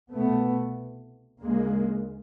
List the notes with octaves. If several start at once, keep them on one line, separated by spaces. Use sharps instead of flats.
C2 B2 A3 B3
D2 C#3 G#3 A#3